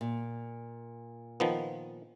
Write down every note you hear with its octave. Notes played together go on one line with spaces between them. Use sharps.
A#2
D#3 F3 B3